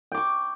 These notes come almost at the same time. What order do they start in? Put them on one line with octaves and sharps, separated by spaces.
G5 D6 C#6